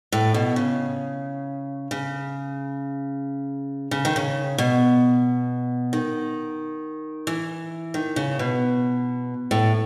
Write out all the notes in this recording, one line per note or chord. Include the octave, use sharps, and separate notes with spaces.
A2
B2
C#3
C#3
C#3
D#3
C#3
B2
D#3
E3
D#3
C#3
B2
A2